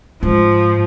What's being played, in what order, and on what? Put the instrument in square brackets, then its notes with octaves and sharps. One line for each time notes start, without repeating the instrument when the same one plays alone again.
[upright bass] G#2 [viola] F3